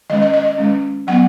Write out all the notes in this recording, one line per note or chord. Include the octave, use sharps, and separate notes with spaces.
D#3 G#3 C#4 D#5
D#5
D#5
D#5
D#3 G#3 C#4
F#3 B3 F#5